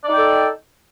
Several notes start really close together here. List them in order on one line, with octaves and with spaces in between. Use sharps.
D5 D#4 G5 A4